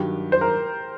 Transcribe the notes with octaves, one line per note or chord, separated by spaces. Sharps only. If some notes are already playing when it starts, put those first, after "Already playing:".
Already playing: G2 D#3 F#3 G4
C5
A#4